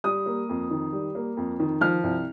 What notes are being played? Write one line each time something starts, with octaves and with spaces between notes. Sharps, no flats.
G3 D#6
A#3
F2
D#3
G3
A#3
F2
D#3
F3 F6
C2